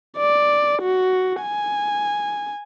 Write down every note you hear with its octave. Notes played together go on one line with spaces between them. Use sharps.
D5
F#4
G#5